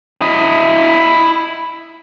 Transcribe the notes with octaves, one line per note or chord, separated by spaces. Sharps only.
E4 D#5